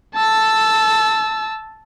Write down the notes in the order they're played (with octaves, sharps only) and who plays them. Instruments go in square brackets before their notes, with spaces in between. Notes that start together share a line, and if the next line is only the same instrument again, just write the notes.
[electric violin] A5 E6